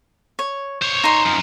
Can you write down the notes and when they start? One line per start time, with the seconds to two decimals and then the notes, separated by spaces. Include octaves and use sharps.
0.39 C#5
0.82 C5 C#5
1.04 D#4 C6
1.26 F#2 F3